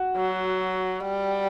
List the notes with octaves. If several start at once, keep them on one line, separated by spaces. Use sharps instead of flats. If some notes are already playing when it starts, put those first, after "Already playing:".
Already playing: F#4
F#3
G3